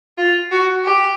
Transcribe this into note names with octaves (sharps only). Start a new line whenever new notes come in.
F4
F#4
G4